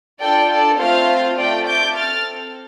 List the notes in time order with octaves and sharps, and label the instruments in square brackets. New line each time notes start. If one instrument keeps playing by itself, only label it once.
[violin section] D4 F4 A4 D5 G5
A4 D5
A3 C4 F4 C5 F5
A3 C4 F4 A4 D5 G5
D6 G6
C4 A4 F6 A6